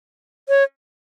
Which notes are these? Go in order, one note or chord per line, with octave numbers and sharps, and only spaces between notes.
C#5